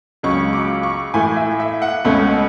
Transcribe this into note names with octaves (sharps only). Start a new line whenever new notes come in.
C#2 C#3 F#3 C#4 C#6
D6
C#6
A2 E3 A3 G#5
E5
E5
F#5
C#2 B2 A3 C#4